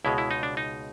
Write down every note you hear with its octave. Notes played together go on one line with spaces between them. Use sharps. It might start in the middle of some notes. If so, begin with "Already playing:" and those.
C#2 B2 G#3 E4
E4
D#4
D4
D#4